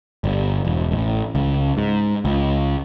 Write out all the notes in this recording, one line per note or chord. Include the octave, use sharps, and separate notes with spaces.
G1
E1
A1
C#2
G#2
C#2